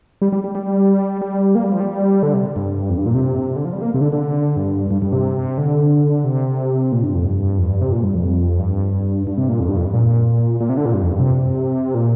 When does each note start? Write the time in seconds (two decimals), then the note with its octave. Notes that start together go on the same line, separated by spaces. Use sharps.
0.22 G3
0.32 G3
0.44 G3
0.55 G3
1.21 G3
1.55 A#3
1.64 G3
1.72 F3
1.80 G3
2.23 D3
2.34 C3
2.56 G2
2.90 F2
2.98 G2
3.06 A#2
3.14 C3
3.56 D3
3.65 F3
3.73 G3
3.82 A#3
3.94 C3
4.01 D3
4.12 D3
4.56 G2
4.91 G2
5.02 G2
5.12 C3
5.58 D3
6.24 C3
6.92 A#2
7.03 G2
7.15 F2
7.25 G2
7.59 F2
7.70 G2
7.81 C3
7.92 A#2
8.04 G2
8.15 F2
8.59 G2
9.27 G2
9.38 C3
9.49 A#2
9.60 F2
9.69 G2
9.77 F2
9.85 G2
9.94 A#2
10.61 A#2
10.69 C3
10.77 D3
10.86 A#2
10.94 G2
11.03 F2
11.11 G2
11.20 C3
11.95 A#2